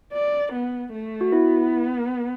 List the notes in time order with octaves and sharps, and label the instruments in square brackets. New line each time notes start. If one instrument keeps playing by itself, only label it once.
[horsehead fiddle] D5
B3
A3
[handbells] F#4
[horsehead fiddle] B3 [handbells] E4